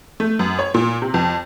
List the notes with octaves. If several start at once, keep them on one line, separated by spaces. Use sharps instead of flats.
A3
F#2
C#5
A#2
C3
F2